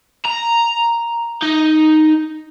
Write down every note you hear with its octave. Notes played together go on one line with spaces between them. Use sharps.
A#5
D#4